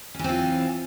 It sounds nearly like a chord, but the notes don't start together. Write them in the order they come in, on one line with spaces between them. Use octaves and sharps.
C#4 E3 C4 F4